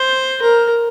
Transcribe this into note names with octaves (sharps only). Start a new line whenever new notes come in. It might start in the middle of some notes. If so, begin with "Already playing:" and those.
Already playing: C5
A#4